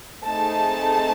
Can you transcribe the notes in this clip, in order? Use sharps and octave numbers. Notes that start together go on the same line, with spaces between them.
A3 C4 D#4 G#4 A5